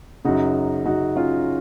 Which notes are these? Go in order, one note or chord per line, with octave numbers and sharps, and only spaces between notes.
F#2 C#3 D#4 F#4
F#2 C#3 D#4 F#4
C#4 F4